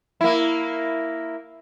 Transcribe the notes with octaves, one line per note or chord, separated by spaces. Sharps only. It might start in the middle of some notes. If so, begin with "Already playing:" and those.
A#3 E4